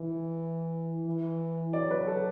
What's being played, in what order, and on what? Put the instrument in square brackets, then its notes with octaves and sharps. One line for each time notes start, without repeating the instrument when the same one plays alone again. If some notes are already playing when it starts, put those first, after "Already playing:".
Already playing: [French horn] E3
E3
[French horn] F#3 [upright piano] D5
[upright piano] B4
A4